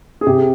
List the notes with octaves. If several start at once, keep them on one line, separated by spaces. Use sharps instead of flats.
G#4
C3 G4